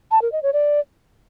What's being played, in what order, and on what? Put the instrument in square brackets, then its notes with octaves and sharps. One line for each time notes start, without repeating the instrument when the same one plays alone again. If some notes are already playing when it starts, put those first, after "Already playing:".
[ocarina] A5
A#4
D#5
C#5
D5